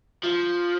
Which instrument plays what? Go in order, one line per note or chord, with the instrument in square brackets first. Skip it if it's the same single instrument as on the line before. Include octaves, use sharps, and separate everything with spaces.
[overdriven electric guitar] F3